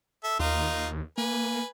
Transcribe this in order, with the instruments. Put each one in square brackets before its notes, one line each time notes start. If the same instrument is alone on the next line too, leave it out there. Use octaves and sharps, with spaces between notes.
[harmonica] A4 E5
[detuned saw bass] D#2 [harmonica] A#3 D#4 F4
[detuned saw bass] A#3 [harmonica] B4 G#5